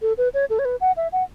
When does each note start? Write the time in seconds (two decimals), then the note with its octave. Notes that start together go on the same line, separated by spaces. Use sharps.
0.02 A4
0.18 B4
0.34 C#5
0.50 A4
0.59 C#5
0.65 B4
0.81 F#5
0.97 E5
1.12 F#5